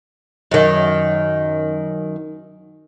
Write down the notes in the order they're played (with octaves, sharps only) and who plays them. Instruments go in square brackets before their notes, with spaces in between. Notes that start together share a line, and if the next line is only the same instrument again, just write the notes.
[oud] F#2 D#3